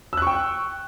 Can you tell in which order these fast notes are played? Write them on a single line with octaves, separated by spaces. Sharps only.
E6 F#6 C#6 G5